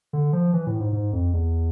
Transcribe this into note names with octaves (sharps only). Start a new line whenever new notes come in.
D3
F3
E3
A2
G#2
G#2
F2
E2